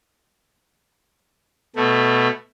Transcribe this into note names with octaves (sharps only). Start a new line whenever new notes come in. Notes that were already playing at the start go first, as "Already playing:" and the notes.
B2 A3